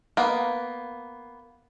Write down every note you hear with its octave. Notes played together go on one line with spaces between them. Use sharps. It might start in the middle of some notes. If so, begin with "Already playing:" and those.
A#3 B3